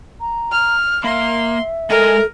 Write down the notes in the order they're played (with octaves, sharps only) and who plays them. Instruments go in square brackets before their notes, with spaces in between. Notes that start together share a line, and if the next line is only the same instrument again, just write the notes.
[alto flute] A#5
[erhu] F6
[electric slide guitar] A#3 [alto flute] E5 [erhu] C6
[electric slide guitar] G#3 D#5 G#5 [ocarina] A4 [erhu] A#4